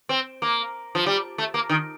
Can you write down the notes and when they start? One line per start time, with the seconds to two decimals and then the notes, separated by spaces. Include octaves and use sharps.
0.09 C4
0.42 A#3
0.95 F3
1.06 G3
1.38 A3
1.54 A#3
1.69 D#3